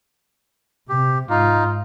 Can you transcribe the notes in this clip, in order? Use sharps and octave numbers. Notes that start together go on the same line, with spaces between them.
C3 G4
G#2 D#4 F4